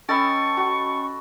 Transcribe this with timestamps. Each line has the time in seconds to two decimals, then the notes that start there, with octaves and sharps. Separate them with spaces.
0.09 C#4 A4 D#5 G5 B5 C#6 A6
0.57 F#4